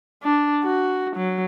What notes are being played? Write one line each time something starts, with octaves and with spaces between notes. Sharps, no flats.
D4
F#4
F#3